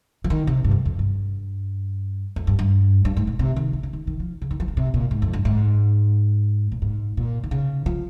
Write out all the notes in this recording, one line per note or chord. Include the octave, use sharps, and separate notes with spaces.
F3
D#3
C3
G2
F2
F2
G2
F2
G2
G2
G2
G#2
A#2
C3
D#3
D#3
C#3
D#3
D#3
F3
C#3
D#3
F3
D#3
C3
A#2
G#2
F2
G2
G#2
A#2
G#2
A#2
D#3
C#3
F3